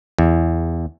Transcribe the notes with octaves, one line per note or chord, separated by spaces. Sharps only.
E2